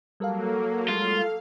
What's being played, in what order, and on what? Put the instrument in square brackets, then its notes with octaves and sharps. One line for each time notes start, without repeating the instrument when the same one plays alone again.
[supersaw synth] F#3 A#3 [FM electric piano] G3 A#4 F5 [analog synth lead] A4
[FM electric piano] G3 G#3 [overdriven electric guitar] F4 [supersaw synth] F5